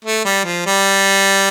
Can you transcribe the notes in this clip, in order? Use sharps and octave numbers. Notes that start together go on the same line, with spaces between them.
A3
G3
F3
G3